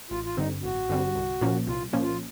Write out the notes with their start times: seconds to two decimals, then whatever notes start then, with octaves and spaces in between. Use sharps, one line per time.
0.11 A1 F4
0.24 F4
0.37 G2 D3 G3 C4 D#4
0.63 A1 F#4
0.89 G2 D3 G3 C4
1.15 C2
1.41 A#2 F3 A#3 C#4
1.67 C2 F4
1.93 A#2 F3 A#3 C#4
2.02 F4